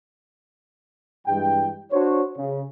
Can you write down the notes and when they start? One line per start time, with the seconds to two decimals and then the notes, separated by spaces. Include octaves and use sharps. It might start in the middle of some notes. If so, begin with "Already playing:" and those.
1.27 G2 E3 G#3 G5
1.91 D4 F#4 C5 C#5
2.37 C#3